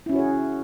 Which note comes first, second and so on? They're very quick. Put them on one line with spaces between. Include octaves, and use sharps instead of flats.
E4 C#4 F#4 C#5 G#4